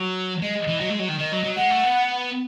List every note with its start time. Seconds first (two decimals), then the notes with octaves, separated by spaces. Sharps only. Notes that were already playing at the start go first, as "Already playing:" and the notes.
Already playing: F#3
0.42 G#3 D#5
0.67 E3
0.80 F#3
0.90 G#3
0.99 F#3
1.09 D#3
1.19 D#3 D#5
1.32 F#3
1.44 F#3
1.57 G#3 F#5
1.70 A3
1.83 B3